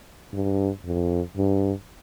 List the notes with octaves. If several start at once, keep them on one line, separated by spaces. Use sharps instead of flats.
G2
F2
G2